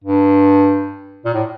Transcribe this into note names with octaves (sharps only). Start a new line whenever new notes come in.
G2
A#2
A2